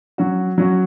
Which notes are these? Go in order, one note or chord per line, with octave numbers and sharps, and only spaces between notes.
F#3 C#4 F#4
F#3 C#4 F#4